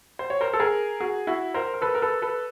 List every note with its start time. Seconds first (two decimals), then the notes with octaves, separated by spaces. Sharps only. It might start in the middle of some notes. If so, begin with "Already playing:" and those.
0.19 C5
0.30 C#5
0.41 A#4 C5
0.53 A4
0.60 G#4 A#4
1.00 F#4 G#4
1.27 E4 F#4
1.54 A#4 C5
1.74 A#4
1.81 A4 B4
1.95 A#4
2.02 A4 B4
2.22 A4 B4